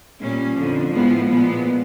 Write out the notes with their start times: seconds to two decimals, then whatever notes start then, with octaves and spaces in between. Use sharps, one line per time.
0.20 A#2 G3 C#4
0.56 F2 D3 F3
0.93 A2 F3 G#3 B3
1.29 A#2 F3 G#3 B3